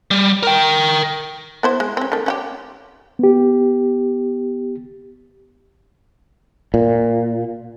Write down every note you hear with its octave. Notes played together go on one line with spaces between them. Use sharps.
G3
A#4 G5
B3 E4 C5
G#3
C4 C#4
D#3 A3
C#4 F#4 G4
B3 G4
A#2